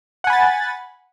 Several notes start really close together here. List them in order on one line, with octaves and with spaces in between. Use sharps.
F#5 G#5 B5 A6